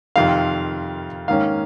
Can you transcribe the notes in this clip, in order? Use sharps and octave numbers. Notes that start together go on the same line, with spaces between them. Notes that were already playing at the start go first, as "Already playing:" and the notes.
F2 C3 D#3 F5
G#2 D#3 A#3 C#4 F5